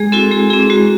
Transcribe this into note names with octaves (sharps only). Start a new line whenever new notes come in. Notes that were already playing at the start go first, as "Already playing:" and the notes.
Already playing: G#3 G#4
C4 E4 F#4 A4
G#3 G#4
C4 E4 G#4
G#3 F#4